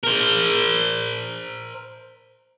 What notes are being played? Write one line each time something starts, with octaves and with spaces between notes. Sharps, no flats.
A#4 C5